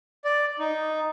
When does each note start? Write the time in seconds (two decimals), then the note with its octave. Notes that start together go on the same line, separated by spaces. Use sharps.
0.25 D5
0.59 D#4